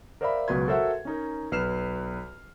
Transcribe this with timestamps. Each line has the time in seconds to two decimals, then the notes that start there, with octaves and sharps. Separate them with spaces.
0.21 A#4 C5 D5 E5 F5 B5
0.48 C#2 B2 F#3 B4 C6 G#6
0.67 F#4 A4 A#4 C5 E5 F#5
1.05 C#4 D#4 A#4
1.52 B1 B4 F6 C7 E7